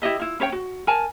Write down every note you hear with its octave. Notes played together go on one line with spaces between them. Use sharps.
E4 G4 D#5 E5
E4 F4
C#4 B4 C#5 G5
F#4
A#4 G#5 A5